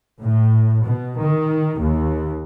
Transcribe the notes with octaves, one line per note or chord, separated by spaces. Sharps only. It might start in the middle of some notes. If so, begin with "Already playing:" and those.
A2
B2
D#3
D#2